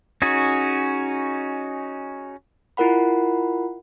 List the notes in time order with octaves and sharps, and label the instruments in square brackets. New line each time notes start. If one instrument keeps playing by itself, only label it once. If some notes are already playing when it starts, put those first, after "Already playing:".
[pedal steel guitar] C#4 D#4 F#4 G#4
[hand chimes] E4 F4 A#4 F#5 B5